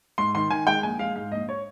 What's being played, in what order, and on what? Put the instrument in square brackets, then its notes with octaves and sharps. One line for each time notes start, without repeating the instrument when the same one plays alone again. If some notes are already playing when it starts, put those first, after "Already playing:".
[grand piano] G#2 C6
D#3 C6
D#3 G#5
G#3 G5
A#1 G#5
G#3 F5
G#2 F5
A#1 D#5
C#5